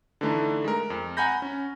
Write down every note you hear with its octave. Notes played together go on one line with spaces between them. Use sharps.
D3 E3 A3 D#4
G#3 A#4
F2
F#5 G#5 A#5 B5 G6 A#6
C#4